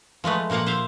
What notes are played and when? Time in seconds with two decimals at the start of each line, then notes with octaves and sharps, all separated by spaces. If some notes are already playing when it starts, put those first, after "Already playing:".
0.24 F3 G#3 A3 B4
0.50 A#2 F3 A#3 F5 F#5
0.66 C5 E5 F5